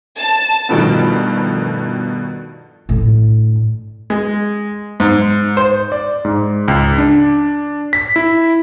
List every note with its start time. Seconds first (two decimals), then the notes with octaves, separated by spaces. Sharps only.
0.20 A5
0.69 G2 B2 D#3 F3 A3 B3
2.89 A2 D3
4.10 G#3
5.00 G#2
5.57 C5
5.92 D5
6.25 G#2
6.68 C#2
6.98 D4
7.93 B6
8.16 E4